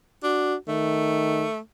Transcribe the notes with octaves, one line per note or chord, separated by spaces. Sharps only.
D4 F#4
D#3 A3